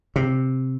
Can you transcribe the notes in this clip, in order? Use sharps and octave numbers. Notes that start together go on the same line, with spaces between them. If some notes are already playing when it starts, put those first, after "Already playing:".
C3